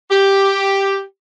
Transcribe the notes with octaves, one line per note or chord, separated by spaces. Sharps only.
G4